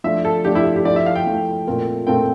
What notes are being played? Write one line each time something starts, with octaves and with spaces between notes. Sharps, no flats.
F3 A3 D4 E5
A4
F3 A3 D4 G4
E4
G4
F3 A3 E4 D5
E5
F5
G5
F3 A3 E4
A#2 A3 C4 F4 A#4
A#2 A3 C4 F4 A#4 G5